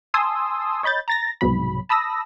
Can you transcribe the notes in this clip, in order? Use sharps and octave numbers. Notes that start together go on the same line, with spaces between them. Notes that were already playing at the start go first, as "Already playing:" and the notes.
G#5 A5 C6 D#6 E6
C#5 D#5 B5 G6 A6
A#5 A6 A#6
C2 G#2 B2 F#3 B5
A5 B5 D#6 E6 A#6